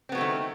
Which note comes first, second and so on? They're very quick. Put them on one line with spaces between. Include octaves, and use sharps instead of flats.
C4 B3 F#3 A3 D#3